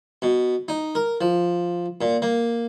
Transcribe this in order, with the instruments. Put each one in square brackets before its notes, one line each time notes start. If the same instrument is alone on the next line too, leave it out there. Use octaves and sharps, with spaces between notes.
[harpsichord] B2
D#4
A#4
F3
A#2
A#3